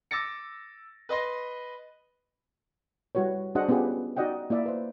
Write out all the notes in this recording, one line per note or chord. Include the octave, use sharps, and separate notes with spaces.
D6 E6 A6 A#6 C#7
B4 D#5 C6 A#6
G3 E4 F#4 B4 C#5
D4 F#4 G#4 C5 D#5 F#5
B3 C#4 F4 G4 G#4 B4
D#4 F#4 D5 D#5 F#5 G5
A#3 E4 D5 E5
B4 C5